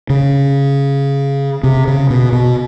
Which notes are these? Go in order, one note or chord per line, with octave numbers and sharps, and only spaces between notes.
C#3
C3
C#3
B2
B2